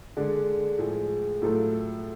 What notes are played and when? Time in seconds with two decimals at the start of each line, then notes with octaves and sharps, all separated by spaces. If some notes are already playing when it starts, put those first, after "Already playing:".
0.17 D3 G#3 D4
0.78 A2 F3 G#3
1.42 A2 F#3 A3 F4 A4